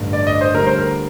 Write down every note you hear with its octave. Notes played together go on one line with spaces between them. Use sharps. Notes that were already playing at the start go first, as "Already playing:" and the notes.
Already playing: A1 G2 D3
D5
D#5
C5
D2 D3 G3 A#4
C5
A#4